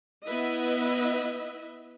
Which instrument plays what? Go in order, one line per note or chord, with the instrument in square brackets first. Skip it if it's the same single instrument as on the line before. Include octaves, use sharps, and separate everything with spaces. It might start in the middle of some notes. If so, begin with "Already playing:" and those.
[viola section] B3 E4 B4 D#5 E5